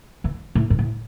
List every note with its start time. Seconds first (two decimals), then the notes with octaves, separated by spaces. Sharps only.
0.24 E3
0.55 A2
0.70 G#2
0.79 A2